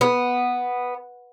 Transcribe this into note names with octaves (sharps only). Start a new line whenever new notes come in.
B3